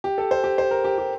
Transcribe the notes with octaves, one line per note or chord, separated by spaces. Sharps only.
G4
A4
C5
G4
C5
A#4
G4
G4